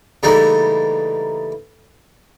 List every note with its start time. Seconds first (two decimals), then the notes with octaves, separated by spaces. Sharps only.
0.23 C#3 E3 G3 A3 A#3 D#4